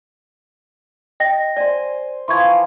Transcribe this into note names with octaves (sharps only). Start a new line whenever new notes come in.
D#5 G5 A#6
C5 D5 G#5
E3 F3 C6 C#6 G#6